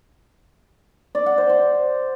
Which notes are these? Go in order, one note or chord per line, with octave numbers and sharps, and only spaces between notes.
D5
F#5
C5
C5